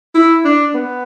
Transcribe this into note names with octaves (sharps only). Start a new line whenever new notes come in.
E4
D4
B3